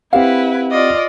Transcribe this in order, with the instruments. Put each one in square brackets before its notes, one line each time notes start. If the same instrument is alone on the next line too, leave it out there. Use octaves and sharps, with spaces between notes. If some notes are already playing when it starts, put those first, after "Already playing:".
[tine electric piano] C4 G4 F#5 [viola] E4 B4 [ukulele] F5
[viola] F4 D5 [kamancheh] D#5